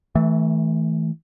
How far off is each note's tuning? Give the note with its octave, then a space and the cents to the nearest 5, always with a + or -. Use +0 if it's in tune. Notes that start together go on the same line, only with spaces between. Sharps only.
E3 -25 A3 +0